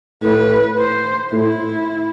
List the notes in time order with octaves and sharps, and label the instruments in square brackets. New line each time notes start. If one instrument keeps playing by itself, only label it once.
[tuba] A2 [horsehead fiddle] B4
[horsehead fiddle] C5
[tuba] A2 [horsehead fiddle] E4